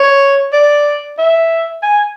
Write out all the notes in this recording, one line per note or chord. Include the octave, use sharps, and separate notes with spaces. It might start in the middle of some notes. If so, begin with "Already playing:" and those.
Already playing: C#5
D5
E5
G#5